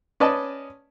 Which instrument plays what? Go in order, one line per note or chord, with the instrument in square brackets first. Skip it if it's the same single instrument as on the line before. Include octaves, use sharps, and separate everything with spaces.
[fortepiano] C#4 B4 D5 D#5 A5